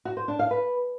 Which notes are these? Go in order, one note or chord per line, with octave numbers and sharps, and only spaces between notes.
F#4
C5
D4
F5
B4